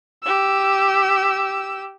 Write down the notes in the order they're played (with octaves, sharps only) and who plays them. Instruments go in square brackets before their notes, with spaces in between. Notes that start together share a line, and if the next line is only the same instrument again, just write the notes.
[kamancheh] G4 E6